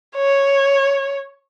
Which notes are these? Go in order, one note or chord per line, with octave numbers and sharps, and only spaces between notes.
C#5